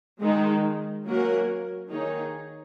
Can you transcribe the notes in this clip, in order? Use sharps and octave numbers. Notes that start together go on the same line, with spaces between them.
D#3 G#3 D#4
F#3 A#3 C#4 F#4 A#4
D#3 A#3 D#4 G#4 C#5